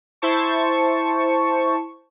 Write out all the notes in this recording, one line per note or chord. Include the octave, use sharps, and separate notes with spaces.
E4 C5 A5 C#6